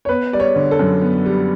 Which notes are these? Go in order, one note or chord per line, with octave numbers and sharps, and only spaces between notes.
C#5
B3 B4
G3 D5
C#5
D3
A4
F#2
B3
G3